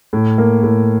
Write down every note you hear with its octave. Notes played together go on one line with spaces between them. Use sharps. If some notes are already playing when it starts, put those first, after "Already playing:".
A2
A#3
A2